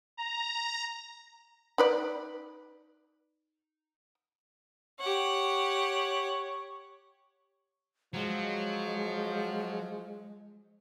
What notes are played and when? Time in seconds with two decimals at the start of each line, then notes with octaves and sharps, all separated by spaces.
0.17 A#5
1.78 D#4 B4 D5
5.00 G4 C#5 F#5
8.14 F3 F#3 G#3